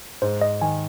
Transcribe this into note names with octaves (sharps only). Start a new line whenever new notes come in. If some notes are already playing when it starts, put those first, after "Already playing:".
G#2 C5
D#5
D#3 G#5